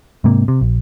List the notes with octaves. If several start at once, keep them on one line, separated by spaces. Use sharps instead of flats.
G#2 C3 A#3
C3
A#1